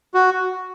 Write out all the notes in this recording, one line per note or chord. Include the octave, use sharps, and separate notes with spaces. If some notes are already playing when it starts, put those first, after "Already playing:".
F#4